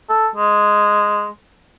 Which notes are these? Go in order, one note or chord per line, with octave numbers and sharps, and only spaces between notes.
A4
G#3